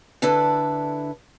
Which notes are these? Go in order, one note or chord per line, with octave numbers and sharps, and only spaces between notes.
D3 D4 E4 A4 B4